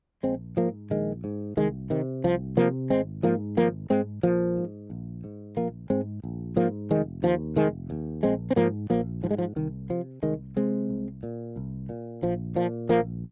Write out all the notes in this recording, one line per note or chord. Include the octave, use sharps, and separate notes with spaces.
A#1 G#3 C4
G#2 F3 A#3
A#1 D#3 G#3
G#2
C2 D#3 G#3
C3 D#3
C2 F3
C3 F3 A#3
G#1 G#3 C4
G#2 F3 A#3
G#1 F3 A#3
G#2 G#3 C4
A#1 F3 A#3
G#2
A#1
G#2
A#1 F3 A#3
G#2 G#3 C4
A#1
G#2 F3 A#3
F1 D#3 G#3
D#2 F3
F1 D#3 G#3
D#2
A#1 G#3 C4
C4
G#2 F3 A#3
A#1 F3 A#3
G#2 F3
G#3
F3
C2 D#3
C3 F3
C2 D#3 G#3
C3 G#3 C4
C2
A#2
C2
A#2
A#1 F3
A#2 F3
A#1 F3 A#3